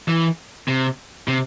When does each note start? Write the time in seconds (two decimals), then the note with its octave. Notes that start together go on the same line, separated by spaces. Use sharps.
0.08 E3
0.68 C3
1.28 C3